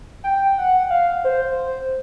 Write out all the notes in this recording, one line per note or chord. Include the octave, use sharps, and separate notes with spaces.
G5
F#5
F5
C5